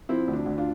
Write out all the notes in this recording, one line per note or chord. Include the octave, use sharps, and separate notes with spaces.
F3 C4 E4
D2
D4
D2
D4 F4